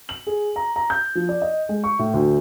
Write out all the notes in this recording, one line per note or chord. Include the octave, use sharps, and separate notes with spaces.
F#7
G#4
A#5
A#5
G6
F3
D5
D#5
G#3
C#6
A2
D2